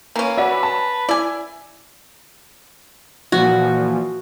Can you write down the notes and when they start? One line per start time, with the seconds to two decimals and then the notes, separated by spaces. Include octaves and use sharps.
0.16 E3 A#3 C#4
0.37 F#4 B4 D5 E5
0.63 A5
1.09 E4 D5 G#5
3.32 A#2 E3 F3 F#4